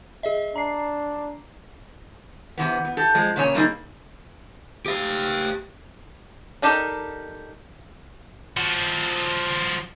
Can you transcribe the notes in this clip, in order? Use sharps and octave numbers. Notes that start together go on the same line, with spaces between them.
G#4 D#5 E5
D4 A#5 C7
C3 E3 B3
B3
G4 A4
F3 G#3 C4
A#2 C#3 A#3 C#5 G#5
C3 G3 A3 A#3 D#4 G#4
G4 F5
D4 D#4 G4 A4 A#4
F3 F#4